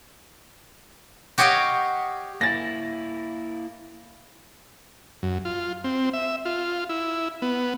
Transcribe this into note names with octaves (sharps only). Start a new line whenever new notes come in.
F#4 G4 C#5 D#5 F5 G5
A#3 E4 A6 A#6
F#2
F4
C4
E5
F4
E4
B3